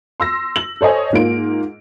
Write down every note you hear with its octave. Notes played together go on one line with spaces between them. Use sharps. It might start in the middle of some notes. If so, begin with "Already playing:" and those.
C6 E6 A#6
F#7
A4 C5 C#5 D#5 G#5
G#2 A#3 F4 D7